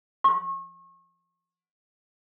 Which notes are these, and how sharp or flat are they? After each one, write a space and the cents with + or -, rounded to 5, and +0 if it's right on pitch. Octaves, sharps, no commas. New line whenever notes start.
C#6 -35